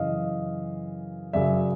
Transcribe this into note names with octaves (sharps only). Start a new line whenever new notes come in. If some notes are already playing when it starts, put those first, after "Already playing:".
Already playing: F#2 C#3 E3 D#5 F5
F#2 C#3 F#3 D5 E5